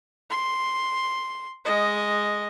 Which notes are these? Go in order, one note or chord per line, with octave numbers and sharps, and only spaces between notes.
C6
G#3 D#5